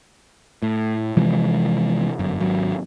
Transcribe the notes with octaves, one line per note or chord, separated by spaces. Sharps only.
A2
C3 E3 F3 G#3
G1 F#2
G#1 F#3